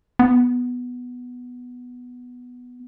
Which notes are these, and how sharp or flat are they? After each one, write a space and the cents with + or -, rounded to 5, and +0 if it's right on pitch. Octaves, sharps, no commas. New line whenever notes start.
B3 +0